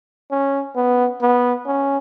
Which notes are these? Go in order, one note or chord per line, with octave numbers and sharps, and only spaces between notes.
C#4
B3
B3
C#4